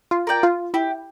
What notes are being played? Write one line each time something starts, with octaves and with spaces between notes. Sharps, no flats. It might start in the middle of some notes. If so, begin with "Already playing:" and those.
F4
A#4 D5 G5
F4
E4 G4